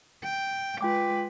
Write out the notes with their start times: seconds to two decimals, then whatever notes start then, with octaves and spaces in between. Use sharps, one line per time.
0.23 G5
0.81 G#3 F4 B4 G5 D6